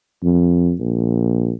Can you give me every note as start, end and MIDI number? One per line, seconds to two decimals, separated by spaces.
0.23 0.74 41
0.80 1.53 34